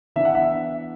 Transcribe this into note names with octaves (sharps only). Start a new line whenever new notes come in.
E3 B3 D4 E5
F#5
E5